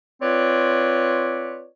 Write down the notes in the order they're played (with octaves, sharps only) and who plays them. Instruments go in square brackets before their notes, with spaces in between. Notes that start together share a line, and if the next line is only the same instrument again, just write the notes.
[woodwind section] C4 F4 B4 C#5 D5